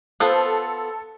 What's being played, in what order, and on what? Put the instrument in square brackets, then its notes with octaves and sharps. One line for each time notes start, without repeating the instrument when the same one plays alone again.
[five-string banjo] B3 F4 C5 [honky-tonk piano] A4